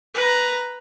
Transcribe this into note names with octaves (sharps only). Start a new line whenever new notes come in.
B4 A#5